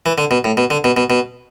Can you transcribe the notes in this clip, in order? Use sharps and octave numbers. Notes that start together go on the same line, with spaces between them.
E3
D3
B2
A2
B2
D3
B2
B2
B2